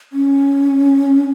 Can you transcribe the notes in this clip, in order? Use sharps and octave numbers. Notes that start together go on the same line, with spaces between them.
C#4